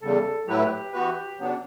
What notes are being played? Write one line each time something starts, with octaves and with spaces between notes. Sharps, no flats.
E2 C#3 G3 A4
A2 F#3 A3 E4 G4 B4
E3 B3 F#4 B4
C#3 F#3 B3 D4